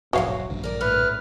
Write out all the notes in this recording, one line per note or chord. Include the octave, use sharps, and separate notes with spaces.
D#1 B1 G#2 E3 F#3 F#4 C#5 F5
A#1 G2 D3
A#4 D5
A2 B4 F6